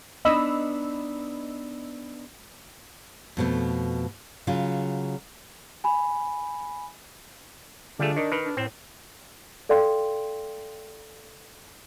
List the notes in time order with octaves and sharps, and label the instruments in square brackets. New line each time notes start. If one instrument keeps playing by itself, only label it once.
[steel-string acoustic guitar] B3 D4 D#4 [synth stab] D#5 B5 E6
[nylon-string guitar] F2 B2 A3
C#3 F#3 F4
[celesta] G#5 B5
[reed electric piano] D3 F4 G#4 [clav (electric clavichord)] G3 A3 [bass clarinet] D4
[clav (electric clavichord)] D#3 [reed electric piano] A#4 D5 D#5
[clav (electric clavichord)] D#3 [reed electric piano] B4 F6
[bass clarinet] D4
[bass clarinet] A2 [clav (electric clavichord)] C4
[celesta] A4 D5 F5 G5 C6